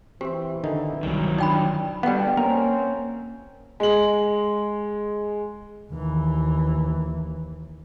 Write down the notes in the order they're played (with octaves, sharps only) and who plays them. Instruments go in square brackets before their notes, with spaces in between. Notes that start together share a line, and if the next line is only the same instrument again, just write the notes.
[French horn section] E3 [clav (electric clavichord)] C4 E5 [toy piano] G4
[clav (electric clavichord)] D3 D#3 D#4
[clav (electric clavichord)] C2 [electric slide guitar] D#3 F#3
[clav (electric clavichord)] D4 [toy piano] D#4 G5 B5
[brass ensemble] B2 D3 [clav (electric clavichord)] G3 B3 [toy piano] F#5 G5
[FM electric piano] A#3 [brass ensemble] C4 C#4 [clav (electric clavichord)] A#4
[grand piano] G#3 F#7
[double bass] D#2 E3